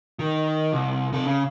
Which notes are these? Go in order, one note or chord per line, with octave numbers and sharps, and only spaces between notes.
D#3
C2
C3 A4
C#3